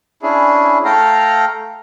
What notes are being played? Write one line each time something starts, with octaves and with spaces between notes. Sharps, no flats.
C#4 D4 E4 G#4
A3 A4 F5 G5 A#5 F6